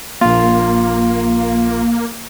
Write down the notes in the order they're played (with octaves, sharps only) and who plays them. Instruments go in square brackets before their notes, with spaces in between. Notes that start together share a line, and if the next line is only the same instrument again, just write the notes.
[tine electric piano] A#1 F4 [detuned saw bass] A#3